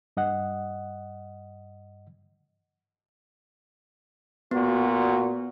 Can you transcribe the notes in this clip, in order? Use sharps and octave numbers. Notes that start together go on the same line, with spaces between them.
G2 D#5 F#5
A#2 B3 F#4